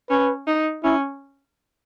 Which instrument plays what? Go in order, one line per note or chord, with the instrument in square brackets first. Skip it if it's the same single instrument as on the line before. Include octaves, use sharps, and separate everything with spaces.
[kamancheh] C#4 [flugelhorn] B4
[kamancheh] D#4
[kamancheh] C#4 [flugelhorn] E4